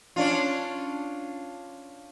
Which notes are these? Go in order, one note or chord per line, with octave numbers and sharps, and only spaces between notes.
C#4 D4 F4